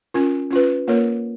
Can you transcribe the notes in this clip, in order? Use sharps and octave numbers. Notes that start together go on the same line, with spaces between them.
C#4 F4 A#4
C#4 F4 B4
A#3 F4 A#4 C#5